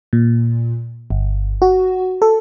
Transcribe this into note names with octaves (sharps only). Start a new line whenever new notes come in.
A#2
G1
F#4
A4